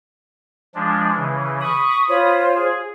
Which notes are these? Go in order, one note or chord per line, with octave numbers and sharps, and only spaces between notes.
F3 G#3 D4
C#3 E3
B5 C#6 D#6
F4 C5 C#5
G#4